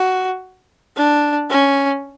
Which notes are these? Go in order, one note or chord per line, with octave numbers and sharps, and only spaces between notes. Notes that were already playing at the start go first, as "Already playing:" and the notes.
Already playing: F#4
D4
C#4